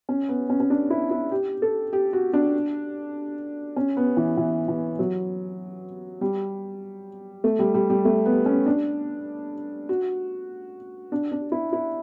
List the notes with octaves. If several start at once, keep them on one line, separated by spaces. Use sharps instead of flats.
C#4
B3
C#4
C#4
D4
E4
E4
G4
A4
G4
F#4
D4
C#4
B3
E3
E3
E3
F#3
G3
A3
G3
G3
G3
A3
B3
C#4
D4
F#4
D4
D4
E4
E4